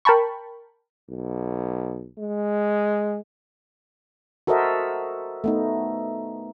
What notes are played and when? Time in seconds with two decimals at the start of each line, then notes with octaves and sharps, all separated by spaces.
0.05 A#4 G5 A5 B5 C#6
1.09 B1
2.18 G#3
4.47 F#4 A4 A#4 C5 D#5 E5
5.44 A3 B3 D#4